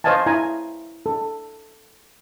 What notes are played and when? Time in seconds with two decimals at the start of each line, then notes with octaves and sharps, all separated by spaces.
0.04 C5 C#5 D#5 F5 G#5 A5
0.26 E4 G#5 A#5
1.06 A4